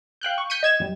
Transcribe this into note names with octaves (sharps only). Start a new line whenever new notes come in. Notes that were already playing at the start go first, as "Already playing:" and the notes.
F5 G5 F#6 G6
C#6
G6 B6 C#7 D#7
D#5 G#6 E7
F#2 G3